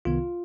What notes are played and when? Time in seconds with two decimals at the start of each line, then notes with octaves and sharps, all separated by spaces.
0.05 C2 C3 D#3 B3 F4